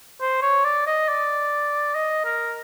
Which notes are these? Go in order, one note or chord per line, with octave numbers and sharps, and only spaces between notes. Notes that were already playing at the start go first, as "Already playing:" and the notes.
C5
C#5
D5
D#5
D5
D#5
A#4